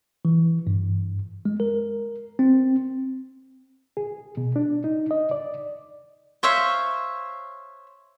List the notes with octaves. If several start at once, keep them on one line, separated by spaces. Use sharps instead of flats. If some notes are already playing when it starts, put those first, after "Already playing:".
E3
G2
G#3
A#4
C4
G#4
B2
D4
D#4
D#5
D5
C5 C#5 E5 F5